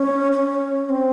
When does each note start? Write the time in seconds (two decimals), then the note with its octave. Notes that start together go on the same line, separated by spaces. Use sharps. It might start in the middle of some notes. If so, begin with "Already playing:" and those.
Already playing: C#4
0.32 C#4
0.89 C4